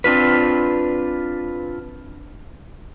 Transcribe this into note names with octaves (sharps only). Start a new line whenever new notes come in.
C4 D4 F4 B4